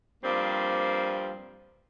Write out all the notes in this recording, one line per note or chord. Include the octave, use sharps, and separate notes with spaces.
G2 F3 A#3 C4